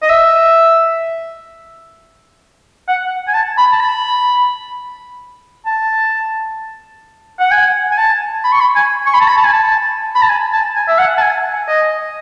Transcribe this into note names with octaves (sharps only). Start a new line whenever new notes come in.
D#5
E5
F#5
G#5
A5
B5
A5
B5
A5
F#5
G#5
G#5
A5
B5
C#6
B5
G#5
C#6
B5
A5
B5
A5
G#5
A5
B5
A5
G#5
A5
G#5
E5
F#5
A5
G#5
D#5